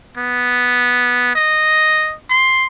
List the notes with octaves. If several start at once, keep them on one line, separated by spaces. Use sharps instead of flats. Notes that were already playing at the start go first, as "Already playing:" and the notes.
B3
D#5
C6